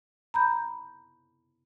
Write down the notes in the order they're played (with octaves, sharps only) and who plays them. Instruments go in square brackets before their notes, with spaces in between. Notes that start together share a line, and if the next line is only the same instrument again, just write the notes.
[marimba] A#5 B5 G6